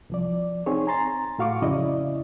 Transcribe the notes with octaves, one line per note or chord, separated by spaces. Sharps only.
C2 F3 D5
C4 D#4 G#4 C#5
G#5 A#5 C6 A6
A2 F#4 F5 C#6 D6
F2 C#3 E4 D5 D#5